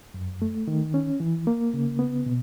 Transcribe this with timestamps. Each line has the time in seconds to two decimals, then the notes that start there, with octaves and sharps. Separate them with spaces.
0.14 F#2
0.42 A3
0.68 D#3
0.94 C#4
1.20 E3
1.47 A#3
1.74 C#3
1.99 B3
2.26 B2